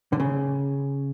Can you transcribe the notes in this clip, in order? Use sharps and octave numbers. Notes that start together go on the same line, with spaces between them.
D3
C#3